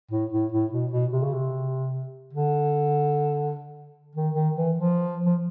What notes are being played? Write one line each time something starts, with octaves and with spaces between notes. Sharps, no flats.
A2
A2
A2
B2
B2
C3
C#3
C3
D3
D#3
D#3
E3
F3
F3